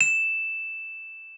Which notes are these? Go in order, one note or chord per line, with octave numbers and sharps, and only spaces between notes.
E7